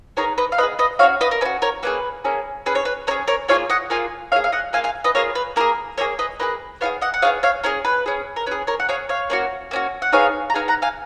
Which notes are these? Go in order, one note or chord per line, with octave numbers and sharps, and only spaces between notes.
B3 D#4 G#4 A#4 C#5
B4 D#5
F5
B3 D#4 G#4 B4 D#5
B4 D#5
C#4 F#4 C#5 F5
B4 D#5
A#4
C#4 F#4 B4
A#4 C#5
A#3 C#4 G#4 B4
A#3 C#4 G#4
C#4 G#4 B4
C#5
B4
C#4 G#4 A#4 C#5
A#4 C#5
A#3 F4 G#4 C#5 F5
D#5 F#5
A#3 F4 G#4 F5 G#5
A#3 F4 G#4 C#5 F5
F5
D#5 F#5
A#3 F4 G#4 F5 G#5
F5 G#5
B4 D#5
A#3 F4 G#4 A#4 C#5
B4
A#3 F4 G#4 A#4
A#3 F4 G#4 A#4 C#5
B4 D#5
A#3 F4 G#4 B4 D#5
B3 F4 G#4 C#5 F5
D#5 F#5
F#5
B3 F4 G#4 C#5 F5
C#5 F5
C#4 G#4 A#4
B4
C#4 G#4
A#4
C#4 G#4 B4
A#4 C#5
F#5
C#4 G#4 C#5 F5
C#5 F5
A#3 C#4 F#4
A#3 C#4 F#4
F#5
B3 D#4 G#4 C#5 F5
A#5
B3 D#4 G#4 F5 G#5
F#5 A#5
F5 G#5